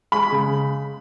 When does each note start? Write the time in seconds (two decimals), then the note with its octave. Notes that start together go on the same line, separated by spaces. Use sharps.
0.12 G#3 B5
0.32 C#3